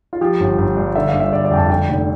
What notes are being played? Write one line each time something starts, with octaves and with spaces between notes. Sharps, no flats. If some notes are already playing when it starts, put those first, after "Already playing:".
F4
F3 G4
G1
G1
G2
D3 E5
F5
G1
E5
G1 D5
D5
F2 G5
A5
D3 G5
F1